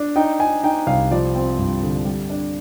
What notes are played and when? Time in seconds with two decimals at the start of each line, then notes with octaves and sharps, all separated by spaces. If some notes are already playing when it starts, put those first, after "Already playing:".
Already playing: D4
0.16 D#4 G5
0.39 D#4 G#5
0.63 D#4 G5
0.87 C2 F5
1.11 F3 D5
1.35 C4
1.58 G2
1.82 D3
2.05 G3
2.30 D4